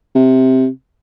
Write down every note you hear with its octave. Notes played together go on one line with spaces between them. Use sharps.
C3